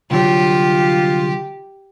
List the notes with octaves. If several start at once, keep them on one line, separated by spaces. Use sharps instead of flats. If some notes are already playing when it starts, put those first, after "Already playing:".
C2 D3 F#3 F4 G4